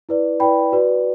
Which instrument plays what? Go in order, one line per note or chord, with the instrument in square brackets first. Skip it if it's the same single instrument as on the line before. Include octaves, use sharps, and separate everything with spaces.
[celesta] E4 B4 D5
E4 B4 D5 G5 B5
F#4 B4 D5